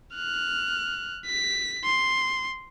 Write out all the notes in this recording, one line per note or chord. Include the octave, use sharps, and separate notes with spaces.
F6 F#6
B6
C6